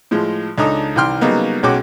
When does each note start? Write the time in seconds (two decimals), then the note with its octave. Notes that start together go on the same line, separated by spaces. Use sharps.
0.11 A2 F3 G#3
0.58 C#2 D4 D#4 A4 A#5 D#6
0.96 C2 D#3 E3 G5 C6 F6
1.21 C#3 F#3 G3 A#3 B3 D#4
1.63 B1 G#3 C#4 F#4 G5 D6